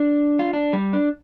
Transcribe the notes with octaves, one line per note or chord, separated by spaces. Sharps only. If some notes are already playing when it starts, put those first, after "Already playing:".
Already playing: D4
F4
D4
G3
D4